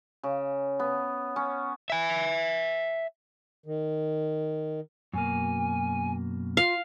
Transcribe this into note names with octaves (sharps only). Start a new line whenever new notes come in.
C#3
B3
C#4
E5 G#5
D#3
F#2 B2 A#3 G#5
F4 F5